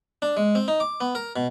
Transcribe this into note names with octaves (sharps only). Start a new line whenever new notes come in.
D4
G#3
C4
D#4
D6
B3
A#4
B2